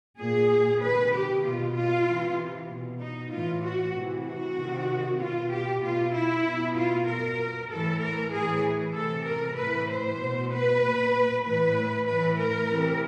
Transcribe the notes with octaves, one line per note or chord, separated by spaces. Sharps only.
A#2 G#4
C3 D#3 B4
G4
B2 F4
F4
C3 E3
B2
D#4
A2 E3 F4
F#4
C3 E3
F#4
C3 D#3
B2 F4
G4
B2 F4
E4
B2
F4
B2 A#4
A2 E3 A4
A#4
A2 E3 G#4
C3 E3 A4
A#4
A2 E3 B4
C5
B2
B4
A#2
A2 E3 B4
A2 E3 B4
A#4
C3 E3